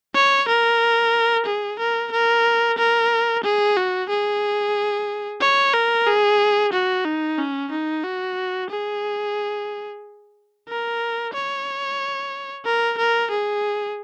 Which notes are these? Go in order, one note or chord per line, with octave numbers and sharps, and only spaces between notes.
C#5
A#4
G#4
A#4
A#4
A#4
G#4
F#4
G#4
C#5
A#4
G#4
F#4
D#4
C#4
D#4
F#4
G#4
A#4
C#5
A#4
A#4
G#4